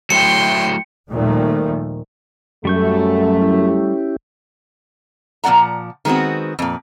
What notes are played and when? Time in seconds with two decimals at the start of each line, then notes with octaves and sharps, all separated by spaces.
0.10 F#3 A3 E4 G5 C6 C#7
1.10 D#2 A#2 D#3 F3 G3 A3
2.65 F#2 G3 A3 C#6 G6
3.42 C#4 E4 G4
5.44 A#2 F3 D#4 D5 F#5 A#5
6.05 D#3 G#3 B3 C4 F#4
6.59 F2 A#2